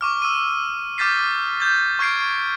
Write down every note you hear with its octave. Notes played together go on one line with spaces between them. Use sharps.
C#6 D6 F6
E6 D#7
D6 F6 G6 A6 B6 C7
D6 G6 A6
C#6 F6 G#6 C7 D7